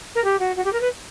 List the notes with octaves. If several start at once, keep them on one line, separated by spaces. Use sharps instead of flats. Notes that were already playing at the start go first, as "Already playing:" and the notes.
A#4
G4
F#4
F#4
G4
A#4
B4